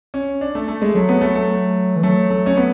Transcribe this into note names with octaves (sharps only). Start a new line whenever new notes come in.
C#4
D4
A3
A3
G#3
F#3 A3
B3
A3
A3
E3
F#3 A3
A3
C#4
B3